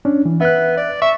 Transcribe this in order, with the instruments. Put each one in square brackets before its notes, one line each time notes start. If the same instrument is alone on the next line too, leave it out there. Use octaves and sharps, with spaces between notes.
[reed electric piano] C#4 D4
E3
[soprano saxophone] B3 [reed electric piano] E5 F#6
[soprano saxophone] D5
[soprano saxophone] E5 [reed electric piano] C#6